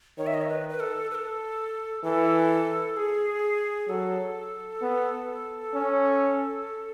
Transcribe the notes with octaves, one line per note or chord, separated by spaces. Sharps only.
D#3 C#5
E5
D#5
C#5
B4
B4
A4
B4
A4
E3 A4
G#4
F#3 A4
B3
C#4